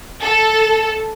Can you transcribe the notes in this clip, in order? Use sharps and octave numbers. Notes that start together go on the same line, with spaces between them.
A4